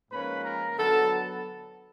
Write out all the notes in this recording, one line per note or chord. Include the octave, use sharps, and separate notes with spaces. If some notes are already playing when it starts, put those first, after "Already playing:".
G#2 F3 A#3 C#4 B4 B5
A#4 A#5
D3 F#3 B3 A4 A5